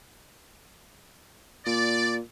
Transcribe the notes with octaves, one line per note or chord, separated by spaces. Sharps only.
A#2 D5